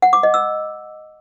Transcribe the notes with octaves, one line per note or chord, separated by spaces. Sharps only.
F#5
D6
D#5
E6